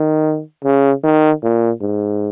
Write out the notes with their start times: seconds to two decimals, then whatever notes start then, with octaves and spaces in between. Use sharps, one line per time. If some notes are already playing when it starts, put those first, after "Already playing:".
Already playing: D#3
0.64 C#3
1.04 D#3
1.43 A#2
1.81 G#2